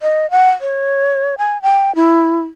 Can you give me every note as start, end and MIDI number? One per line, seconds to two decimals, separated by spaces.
0.02 0.30 75
0.31 0.49 78
0.61 1.35 73
1.38 1.61 80
1.62 1.95 79
1.95 2.41 64